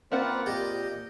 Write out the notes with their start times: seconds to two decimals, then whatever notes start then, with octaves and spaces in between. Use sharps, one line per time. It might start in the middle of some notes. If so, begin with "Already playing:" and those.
0.12 A#3 C4 F4 A#4 B4 D5 F#5
0.46 A#2 G4 D#5